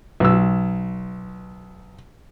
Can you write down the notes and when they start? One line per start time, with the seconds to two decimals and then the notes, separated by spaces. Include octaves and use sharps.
0.20 B1 E6